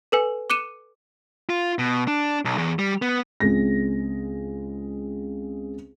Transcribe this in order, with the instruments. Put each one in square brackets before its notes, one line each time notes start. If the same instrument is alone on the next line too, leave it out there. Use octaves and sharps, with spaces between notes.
[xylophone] A4 B4 G#5
D6 F#6 C#7 D#7 E7
[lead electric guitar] F4
B2
D4
B1
E2
G3
B3
[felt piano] C#2 G#3 C4 A#6